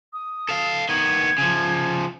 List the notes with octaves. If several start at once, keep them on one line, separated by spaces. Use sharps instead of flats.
D#6
A4 F5
D#3 B3 G#6
C#3 F3